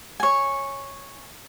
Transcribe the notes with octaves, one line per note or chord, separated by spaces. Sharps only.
C#5 G#5